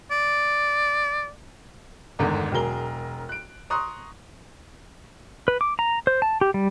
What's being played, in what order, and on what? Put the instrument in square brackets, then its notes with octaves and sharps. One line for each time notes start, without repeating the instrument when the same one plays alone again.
[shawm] D5
[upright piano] G1 E2 G#2 D3 D#3
E1 F#3 G#4 A#4 G7
F#6 D7
A#5 C6 C#6 D#6 F#6
[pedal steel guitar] B4
D6
A#5
C5
A5
G4
G3